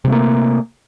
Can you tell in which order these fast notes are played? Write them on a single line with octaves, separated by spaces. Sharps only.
C3 G3 A3 A#3